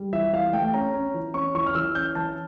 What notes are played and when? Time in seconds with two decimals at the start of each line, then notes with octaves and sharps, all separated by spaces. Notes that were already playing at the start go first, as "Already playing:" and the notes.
Already playing: G3
0.13 E3 E5
0.33 E3 F5
0.53 A3 G5
0.74 C#4 A#5
0.94 C#4
1.14 E3
1.34 C#4 C#6
1.55 E3 C#6
1.66 F6
1.75 E3 E6
1.95 C#4 G6
2.15 E3 A5